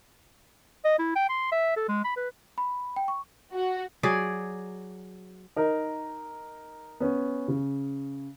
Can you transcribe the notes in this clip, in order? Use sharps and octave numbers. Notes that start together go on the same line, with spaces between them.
D#5
E4
G5
C6
E5
A4
G#3
B5
B4
B5
G5
C#6
F#4
F#3 G#4 D5
D#4 A#4
B3 C#4
C#3